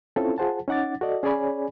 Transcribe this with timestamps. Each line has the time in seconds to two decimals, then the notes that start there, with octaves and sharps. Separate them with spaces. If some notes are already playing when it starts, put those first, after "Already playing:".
0.16 C4 C#4 E4 F4 A4 C#5
0.38 F4 G#4 C5 F#5 A5
0.68 C#4 D#4 F#5 D6 A6
1.01 F#4 A4 D5 D#5
1.23 C#4 G#4 C#5 D5 G#5 B5